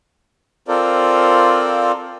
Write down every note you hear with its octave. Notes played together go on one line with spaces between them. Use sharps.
C4 F4 A4 A#4 C5 D5